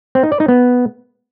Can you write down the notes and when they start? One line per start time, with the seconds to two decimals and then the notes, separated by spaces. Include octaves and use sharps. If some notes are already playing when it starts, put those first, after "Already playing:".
0.15 C4
0.23 D#4
0.32 D5
0.40 D#4
0.48 B3